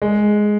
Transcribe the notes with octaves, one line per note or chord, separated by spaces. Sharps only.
G#3